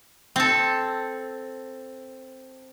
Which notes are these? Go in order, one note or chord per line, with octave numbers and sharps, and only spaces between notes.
C4 A4